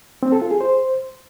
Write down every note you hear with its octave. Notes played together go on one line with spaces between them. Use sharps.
C4
A4
F4
G#4
C5